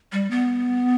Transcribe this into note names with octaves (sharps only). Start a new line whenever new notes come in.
G3
B3